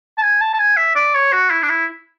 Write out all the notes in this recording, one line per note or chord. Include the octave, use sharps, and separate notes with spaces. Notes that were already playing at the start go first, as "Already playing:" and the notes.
A5
G#5
A5
A5
G#5
E5
D5
C#5
F#4
E4
D4
E4